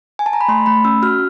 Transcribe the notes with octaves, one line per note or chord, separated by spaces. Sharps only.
G#5
A5
A#5
B5
A3 C6
A3 B5
C#4 E6
F#4 F6